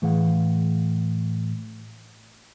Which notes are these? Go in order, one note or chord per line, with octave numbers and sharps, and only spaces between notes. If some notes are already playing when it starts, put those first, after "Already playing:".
A2 E3 G#4 F5 F#5